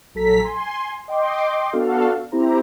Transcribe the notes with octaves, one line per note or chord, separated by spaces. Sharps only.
A#1 F#3 A4 A#5 B6
G#5 C6
D#5 G5 C6 D6
B3 D4 F#4 A4 F5
C4 E4 G4 C5 A#5